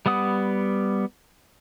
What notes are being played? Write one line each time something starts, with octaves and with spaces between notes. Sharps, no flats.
G3 B3 F#5 D#6